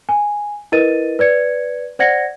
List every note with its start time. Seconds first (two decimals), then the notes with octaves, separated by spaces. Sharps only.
0.09 G#5
0.72 E4 A#4 B4 D#5 A6 D#7
1.19 B4 D5 G#6 C#7
1.99 C5 D5 F#5 G#6 A#6 C#7